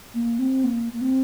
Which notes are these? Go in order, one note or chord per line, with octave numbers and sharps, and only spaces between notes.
A#3
C4
A#3
A#3
C4